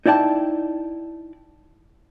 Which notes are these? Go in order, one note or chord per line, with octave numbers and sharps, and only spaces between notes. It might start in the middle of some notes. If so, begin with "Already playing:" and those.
D#4 E4 D5 G5 A5